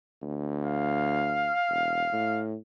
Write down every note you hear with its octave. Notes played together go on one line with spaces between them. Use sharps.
D2
F5
E1
A2